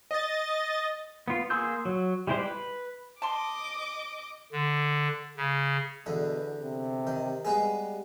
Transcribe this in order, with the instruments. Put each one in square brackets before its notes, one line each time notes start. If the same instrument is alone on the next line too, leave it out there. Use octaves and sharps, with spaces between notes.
[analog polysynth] D#5 A6
[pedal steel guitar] B3 F4
A#3 G#4 C6 E6 G6
F#3
G3 G#3 E4 G4 C5
B4
[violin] D#5 D6 [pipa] A5 C6
[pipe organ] D3
C#3
[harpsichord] E2 D3 [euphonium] B2
[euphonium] C3
[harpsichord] D#3
[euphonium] G3 [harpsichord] G#3 B3 G#4